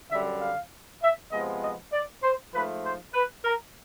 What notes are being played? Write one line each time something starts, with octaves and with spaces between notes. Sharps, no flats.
F#2 D3 G3 E5
F5
E5
C3 F3 G#3 B3 D#5
D#5
D5
C5
G#2 F3 A3 B4
C5
B4
A#4